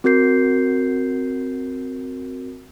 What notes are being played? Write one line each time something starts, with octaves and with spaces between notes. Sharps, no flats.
C4 F#4 A#4 G6 C7